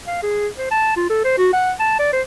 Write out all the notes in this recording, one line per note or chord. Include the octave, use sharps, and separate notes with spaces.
F5
G#4
C5
A5
F4
A4
C5
F#4
F#5
A5
D5
C5